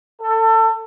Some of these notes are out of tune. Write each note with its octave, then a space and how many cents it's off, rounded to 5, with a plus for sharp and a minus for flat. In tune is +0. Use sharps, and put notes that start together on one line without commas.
A4 +25